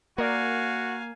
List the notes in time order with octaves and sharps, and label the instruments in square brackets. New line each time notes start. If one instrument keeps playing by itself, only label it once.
[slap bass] A#3 [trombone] F#4 [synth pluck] A#4 D5 [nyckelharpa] F5 G#5